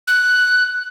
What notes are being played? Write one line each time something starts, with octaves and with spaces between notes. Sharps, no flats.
F#6